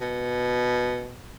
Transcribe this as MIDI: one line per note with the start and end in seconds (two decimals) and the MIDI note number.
0.01 1.21 47